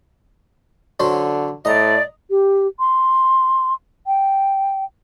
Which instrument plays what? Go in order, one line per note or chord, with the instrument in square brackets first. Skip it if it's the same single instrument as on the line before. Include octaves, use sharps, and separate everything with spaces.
[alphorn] D3 [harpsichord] F#3 C#4 C5
[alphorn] A2 [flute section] D5 [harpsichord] D#5 A#5
[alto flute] G4
C6
G5